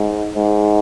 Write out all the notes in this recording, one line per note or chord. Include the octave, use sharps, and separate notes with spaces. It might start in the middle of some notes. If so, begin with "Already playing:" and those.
Already playing: G#2
G#2